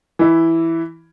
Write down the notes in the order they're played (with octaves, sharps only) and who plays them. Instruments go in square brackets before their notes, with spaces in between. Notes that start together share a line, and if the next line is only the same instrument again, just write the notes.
[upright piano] E3 E4